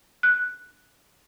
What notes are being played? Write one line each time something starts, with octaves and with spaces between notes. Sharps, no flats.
F#6